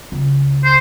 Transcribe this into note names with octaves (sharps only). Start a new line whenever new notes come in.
C#2
C5